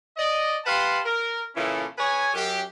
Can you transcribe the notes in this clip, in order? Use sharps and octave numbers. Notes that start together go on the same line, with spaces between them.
D5 D#5
G4 B4 F5 F#5 A5 C6
A#4
A#2 C#3 E3 C#4 E4 A4
G#4 B4 C#5 G#5
F#2 G4